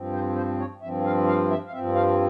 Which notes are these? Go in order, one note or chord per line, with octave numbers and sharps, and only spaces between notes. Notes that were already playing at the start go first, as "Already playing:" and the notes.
Already playing: G2 F3 C4
C5
C5
C#5
G2 F3 C4 E5
F5
F5
E5
F5
G2 F3 C4 E5
F5